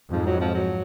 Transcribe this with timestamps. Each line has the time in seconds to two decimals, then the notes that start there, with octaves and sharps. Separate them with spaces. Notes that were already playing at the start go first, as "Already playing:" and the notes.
0.12 F2 G#2 F3
0.26 F#3
0.41 F3
0.55 F#3